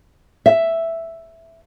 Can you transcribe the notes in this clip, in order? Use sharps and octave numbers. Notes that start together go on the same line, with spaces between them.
E5